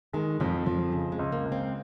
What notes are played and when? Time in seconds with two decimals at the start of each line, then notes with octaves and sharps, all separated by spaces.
0.13 D#3 G#3
0.40 F2 F3
0.66 F2 F3
0.92 C#3 G#3
1.12 G#3
1.19 C#2
1.32 A#3
1.45 C#2
1.52 C4